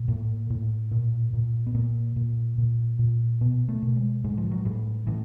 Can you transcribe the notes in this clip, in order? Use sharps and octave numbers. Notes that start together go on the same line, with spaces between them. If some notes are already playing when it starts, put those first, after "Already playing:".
Already playing: A#2
A2 A#3
A2
A#2
A#2
B3
A#2 A#3
A#2
A#2
A#2
B2 B3
A3
B2
G#3
A2 G#3
F3
F#3
A2 G3
A2 E3